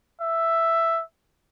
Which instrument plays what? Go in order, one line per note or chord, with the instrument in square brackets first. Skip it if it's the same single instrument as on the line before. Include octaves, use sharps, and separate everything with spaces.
[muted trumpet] E5